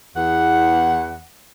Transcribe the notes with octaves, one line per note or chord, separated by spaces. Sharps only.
E2 F#5